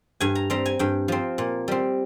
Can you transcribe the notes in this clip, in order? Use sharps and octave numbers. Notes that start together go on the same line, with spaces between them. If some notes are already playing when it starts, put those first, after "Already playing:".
G2 G#5
A#5
G3 C4 A#5
G#5
G2 G5
F3 C4
A#2
G3 C4